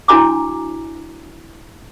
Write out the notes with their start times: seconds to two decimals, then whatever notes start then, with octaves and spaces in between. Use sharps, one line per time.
0.08 D4 E4 F#4 G#5 A#5 D6